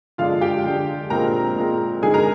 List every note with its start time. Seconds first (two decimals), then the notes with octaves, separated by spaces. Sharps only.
0.18 D3 G#3 D4 F4 F5
0.41 G4 G5
0.65 D3 G#3 D4
1.10 A#2 G#3 C4 A#4 A#5
1.56 A#2 G#3 C4
2.02 D3 G#3 D#4 G#4 G#5
2.14 A#4 A#5